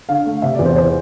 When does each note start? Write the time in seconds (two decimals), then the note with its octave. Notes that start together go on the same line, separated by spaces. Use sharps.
0.09 D3 F5
0.25 A3
0.42 C3 E5
0.55 E2 D5
0.65 C5
0.76 C5